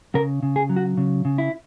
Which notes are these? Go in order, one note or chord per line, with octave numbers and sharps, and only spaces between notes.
C#3 A#4
C#3
G#4
F#3
F#4
C#3
C#3
E4